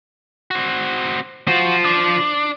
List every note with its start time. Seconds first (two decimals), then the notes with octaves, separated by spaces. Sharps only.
0.51 C4 F#4
1.47 F4 F#4 C5
1.85 D4